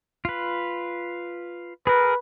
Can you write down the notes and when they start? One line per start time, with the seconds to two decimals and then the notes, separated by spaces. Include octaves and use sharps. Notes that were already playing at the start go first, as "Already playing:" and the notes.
0.25 F4 B4
1.87 G#4 A#4 B4